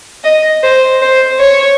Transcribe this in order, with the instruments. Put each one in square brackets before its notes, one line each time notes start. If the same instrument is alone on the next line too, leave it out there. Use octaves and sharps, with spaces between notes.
[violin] D#5
C5
C5
C#5